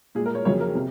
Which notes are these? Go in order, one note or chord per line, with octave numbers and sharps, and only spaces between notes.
A#2 G#4
G#3
A#4
C#5
F2 C#3 F#3 A#3 C#5
A#4
C3